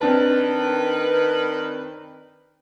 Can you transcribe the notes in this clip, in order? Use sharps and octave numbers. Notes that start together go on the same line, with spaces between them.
D#3 C4 D4 B4 A5